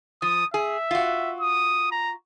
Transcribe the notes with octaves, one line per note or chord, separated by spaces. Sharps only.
F3 D#6
G#4 E5
F4 F#4
D#6
A#5